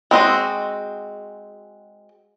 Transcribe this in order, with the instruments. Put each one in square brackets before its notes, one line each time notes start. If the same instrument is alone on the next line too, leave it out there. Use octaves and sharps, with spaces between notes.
[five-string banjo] G#3 C4 F#4 D#5